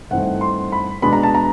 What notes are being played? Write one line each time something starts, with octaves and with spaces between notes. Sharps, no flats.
G2 E3 A3 C4 D#4 F#5
C6
B5
B2 G#3 B3 D4 B5
A#5
A5
A#5